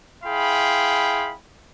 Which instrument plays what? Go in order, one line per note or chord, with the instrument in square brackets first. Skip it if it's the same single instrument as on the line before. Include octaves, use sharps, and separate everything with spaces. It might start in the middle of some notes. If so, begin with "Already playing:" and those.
[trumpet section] E4 G#4 F5 G5 B5 C6